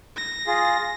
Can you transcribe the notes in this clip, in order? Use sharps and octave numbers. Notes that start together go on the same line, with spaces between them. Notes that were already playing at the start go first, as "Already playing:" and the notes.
A#6
F4 G#4